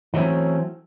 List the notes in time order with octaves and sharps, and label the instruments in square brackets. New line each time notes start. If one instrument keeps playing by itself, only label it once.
[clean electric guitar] E3 F#3 A3 C4 C#4